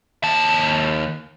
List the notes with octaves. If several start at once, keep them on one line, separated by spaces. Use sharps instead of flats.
D#2 A5